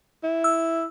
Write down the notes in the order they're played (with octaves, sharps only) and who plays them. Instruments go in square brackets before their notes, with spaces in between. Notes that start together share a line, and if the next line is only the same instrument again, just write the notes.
[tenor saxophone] E4
[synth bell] E6